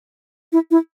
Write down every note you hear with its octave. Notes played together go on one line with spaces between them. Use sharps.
E4
E4